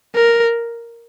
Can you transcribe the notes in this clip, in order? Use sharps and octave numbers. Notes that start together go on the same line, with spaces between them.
A#4